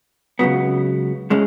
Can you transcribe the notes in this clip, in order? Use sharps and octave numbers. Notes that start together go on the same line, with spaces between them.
C#2 C#3 F#3 B3
A2 G#3 C#4